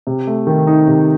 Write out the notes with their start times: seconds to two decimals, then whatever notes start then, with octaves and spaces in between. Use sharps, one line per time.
0.07 C3
0.27 A3
0.47 D#3
0.67 D#4
0.87 C3